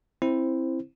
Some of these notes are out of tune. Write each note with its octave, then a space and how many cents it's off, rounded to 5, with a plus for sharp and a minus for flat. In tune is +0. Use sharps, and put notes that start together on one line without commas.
C4 +15 E4 +0 C5 +0